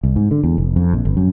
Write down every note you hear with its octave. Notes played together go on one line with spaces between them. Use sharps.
C2
G#2
D3
E2
F1
F2
A#1
G1
F#2